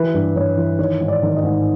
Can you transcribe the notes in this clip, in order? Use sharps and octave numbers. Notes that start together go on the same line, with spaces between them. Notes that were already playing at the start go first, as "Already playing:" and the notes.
Already playing: E3 B4
G2
G2 C#5
E3
D#3 C#5
G#2
D5
D#3
D#5
G#2